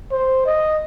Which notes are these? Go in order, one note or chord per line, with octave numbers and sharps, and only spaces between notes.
C5
D#5